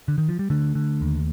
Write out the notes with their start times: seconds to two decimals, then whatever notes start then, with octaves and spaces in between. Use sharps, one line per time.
0.08 D3
0.18 D#3
0.29 F3
0.39 G3
0.50 D3 A3
0.75 D3
1.01 D#2